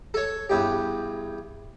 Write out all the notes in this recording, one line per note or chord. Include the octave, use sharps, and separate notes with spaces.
A4 C#5
E2 G2 G4